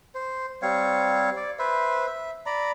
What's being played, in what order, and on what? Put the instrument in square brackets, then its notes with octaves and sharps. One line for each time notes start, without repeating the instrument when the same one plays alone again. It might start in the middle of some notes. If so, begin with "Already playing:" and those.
[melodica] C5
G3 C4 C#5 F5
D5
B4 C5 E5
E5
D5 A#5 B5